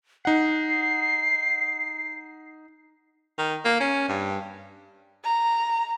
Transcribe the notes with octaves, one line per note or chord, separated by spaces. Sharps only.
D#4 F#5 C7
D#3
A#3
C#4
G2
A#5